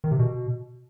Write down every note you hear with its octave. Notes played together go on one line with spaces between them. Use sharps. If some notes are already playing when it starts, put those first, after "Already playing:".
D#3
C3
B2